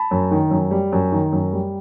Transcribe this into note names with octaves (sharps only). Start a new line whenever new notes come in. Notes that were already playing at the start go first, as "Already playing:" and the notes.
Already playing: A5 B5
F#2
D#3
F#2
G3
F#2
D#3
F#2
G3